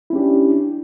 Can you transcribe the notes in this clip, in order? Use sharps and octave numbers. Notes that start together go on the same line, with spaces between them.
C#4 D4 E4 G4